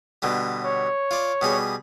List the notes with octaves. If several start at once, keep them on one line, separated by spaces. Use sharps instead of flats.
B2 D3 G3
C#5
F4 D5
B2 G3 G#4